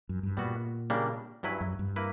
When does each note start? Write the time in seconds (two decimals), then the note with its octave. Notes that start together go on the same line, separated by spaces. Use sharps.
0.09 F#2
0.23 G2
0.37 A#2 G3 B3 F#4
0.90 C#3 G3 A#3 D4
1.43 G2 F#3 C#4 E4 B4
1.61 F#2
1.79 G2
1.96 A#3 E4 B4